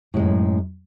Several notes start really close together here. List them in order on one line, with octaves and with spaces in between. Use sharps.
A2 G#3 F#2